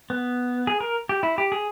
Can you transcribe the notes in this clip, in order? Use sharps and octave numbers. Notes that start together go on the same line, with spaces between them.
B3
G#4
A#4
G4
E4
G4
G#4